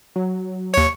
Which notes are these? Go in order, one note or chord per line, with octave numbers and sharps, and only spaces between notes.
F#3
D#2 C#5 C#6